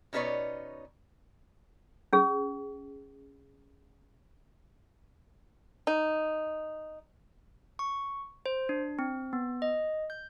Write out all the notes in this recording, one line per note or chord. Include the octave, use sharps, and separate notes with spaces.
B2 C#4 D#4 B4 C#5 D5
C#4 G#4
D#4
C#6
C5
D4
C4
B3
D#5
G6